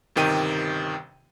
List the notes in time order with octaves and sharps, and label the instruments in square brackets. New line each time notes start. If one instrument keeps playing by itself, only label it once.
[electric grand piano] G1 C3 D#3 G4 G5 D#7